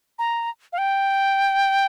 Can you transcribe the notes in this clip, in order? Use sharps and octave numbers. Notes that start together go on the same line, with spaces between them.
A#5
F5
G5